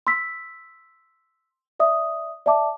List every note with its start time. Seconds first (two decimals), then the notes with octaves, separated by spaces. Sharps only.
0.07 C6 E6 B6
1.80 D5 E5 D#6
2.46 D5 E5 A5 D6